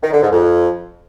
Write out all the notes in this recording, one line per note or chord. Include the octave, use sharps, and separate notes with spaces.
D#3
D3
G#2
F2